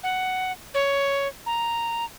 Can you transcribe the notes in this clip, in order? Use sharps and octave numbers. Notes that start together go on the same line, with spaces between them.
F#5
C#5
A#5